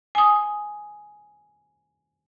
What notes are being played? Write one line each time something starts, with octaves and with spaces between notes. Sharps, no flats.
G#5 D#6